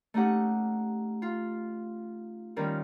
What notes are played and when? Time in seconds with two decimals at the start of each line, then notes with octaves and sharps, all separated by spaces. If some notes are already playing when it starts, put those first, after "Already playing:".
0.14 A3 C#4 D#4 G4 F#5
1.22 F4
2.56 D#3 G3 C#4 F4 A#4